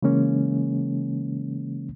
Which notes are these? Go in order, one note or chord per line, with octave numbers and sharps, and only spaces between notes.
C#3 E3 G#3 A#3 C#4